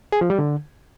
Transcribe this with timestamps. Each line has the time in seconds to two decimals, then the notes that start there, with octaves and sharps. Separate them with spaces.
0.12 G#4
0.21 F3
0.30 G3
0.39 D3